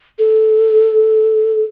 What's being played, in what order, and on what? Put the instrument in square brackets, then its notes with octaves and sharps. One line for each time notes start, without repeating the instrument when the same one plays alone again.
[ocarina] A4